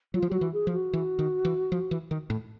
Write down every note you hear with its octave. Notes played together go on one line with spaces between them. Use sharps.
F#3 F4
F3
F#3 F#4 G4
E3
G#4
F3
F#4
E3
D#3
E3
F3
E3
D#3
A2